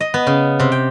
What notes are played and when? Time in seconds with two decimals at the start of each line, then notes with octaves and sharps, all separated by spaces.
0.01 D#5
0.14 B3
0.27 C#3
0.60 C3
0.72 G5